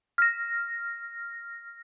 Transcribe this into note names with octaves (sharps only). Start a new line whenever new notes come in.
F6 A#6